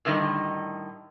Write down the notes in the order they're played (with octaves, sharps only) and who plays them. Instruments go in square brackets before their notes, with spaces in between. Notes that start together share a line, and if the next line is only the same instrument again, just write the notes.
[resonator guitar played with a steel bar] A2 D3 D#3 G3 D#5